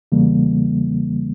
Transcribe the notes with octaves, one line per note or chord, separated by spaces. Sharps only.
E2 C#3 E3 G3 A#3